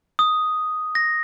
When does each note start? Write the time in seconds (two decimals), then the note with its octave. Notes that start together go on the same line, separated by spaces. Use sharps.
0.19 D#6
0.95 A#6